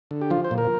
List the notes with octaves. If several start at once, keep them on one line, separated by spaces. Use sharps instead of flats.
D3
G4
F3 F4
C5
A#2
A#4